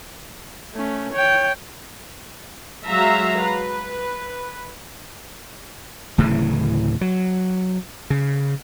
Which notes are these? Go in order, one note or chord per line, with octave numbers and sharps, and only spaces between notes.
A3 C#4
C#5 G5
F#3 G#3 E5 F5 A#5
B4
D1 A2 C#3 E3
F#3
C#3